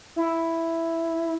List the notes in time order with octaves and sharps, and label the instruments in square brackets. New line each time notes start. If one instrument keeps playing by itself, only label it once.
[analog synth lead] E4